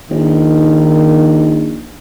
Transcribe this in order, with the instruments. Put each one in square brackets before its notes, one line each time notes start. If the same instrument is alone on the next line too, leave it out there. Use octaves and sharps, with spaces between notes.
[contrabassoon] A#1 [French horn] D#3